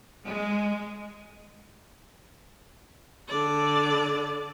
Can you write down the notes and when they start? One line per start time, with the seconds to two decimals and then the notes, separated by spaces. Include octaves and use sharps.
0.25 G#3
3.29 D3 D5